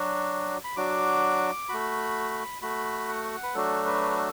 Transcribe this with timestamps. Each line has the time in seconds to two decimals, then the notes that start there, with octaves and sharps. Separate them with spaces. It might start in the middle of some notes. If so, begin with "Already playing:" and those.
Already playing: F#3 D4 F#4
0.64 B5
0.77 F#3 D4 F#4 D6
1.69 A3 F#4 B5
2.62 A3 F#4 B5
3.08 F#5
3.43 B4
3.55 F#3 A3 D4 F#4 A4
3.86 B4
4.16 A4